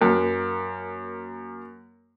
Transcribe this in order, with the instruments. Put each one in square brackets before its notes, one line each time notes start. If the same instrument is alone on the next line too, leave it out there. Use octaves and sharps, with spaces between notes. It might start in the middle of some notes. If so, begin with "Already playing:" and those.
[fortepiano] F#2 A#3